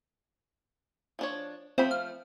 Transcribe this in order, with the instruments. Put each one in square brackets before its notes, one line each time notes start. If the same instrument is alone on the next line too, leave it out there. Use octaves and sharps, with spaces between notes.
[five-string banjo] F3 D4 C#5
[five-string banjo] F3 A3 B5 [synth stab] C4
[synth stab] F5